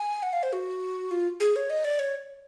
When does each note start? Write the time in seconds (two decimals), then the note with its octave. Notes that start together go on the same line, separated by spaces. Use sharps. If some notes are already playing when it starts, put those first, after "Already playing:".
Already playing: G#5
0.23 F#5
0.33 F5
0.43 C5
0.53 F#4
1.11 F4
1.40 G#4
1.56 C#5
1.70 D#5
1.84 D5
1.99 C#5